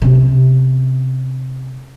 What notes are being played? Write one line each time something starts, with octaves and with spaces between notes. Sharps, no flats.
C3 C#4